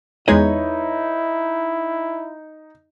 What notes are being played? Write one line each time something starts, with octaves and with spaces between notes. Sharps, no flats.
E2 G#3 D#4 E4 G#4 B4 C#5 D#5